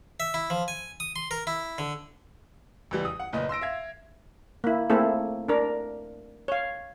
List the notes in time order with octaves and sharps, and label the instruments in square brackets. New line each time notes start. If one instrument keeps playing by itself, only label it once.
[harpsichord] E5
E4
F3
G#5
D#6
C6
A#4
E4
D3
[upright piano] C#2 E3 G3
D#6
F#5
F#1 A#2 B4 D#5
C6 E6 A#6 D7
E5 F5 G#6
[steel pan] A#3 E4
A3 A#3 C4 E4 G#4 A4
D4 A#4
C#5 F5